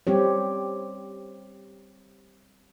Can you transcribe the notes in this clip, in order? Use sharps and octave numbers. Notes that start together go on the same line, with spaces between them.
G3 C4 G4 C#5